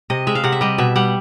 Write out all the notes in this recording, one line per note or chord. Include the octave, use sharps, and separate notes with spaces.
C3 D#5
G#3 E5
F5
C3 F#5
E5
G3 D#5
B2 E5
G3 F#5